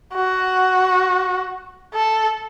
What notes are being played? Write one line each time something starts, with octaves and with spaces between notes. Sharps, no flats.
F#4
A4